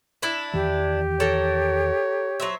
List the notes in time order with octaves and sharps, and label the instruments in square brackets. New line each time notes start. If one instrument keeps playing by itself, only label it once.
[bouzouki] D4 E4 E5
[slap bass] E2 D#3 E3 [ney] G4
[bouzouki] A4 A#4 [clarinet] C#5
[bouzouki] F#3 C5 E5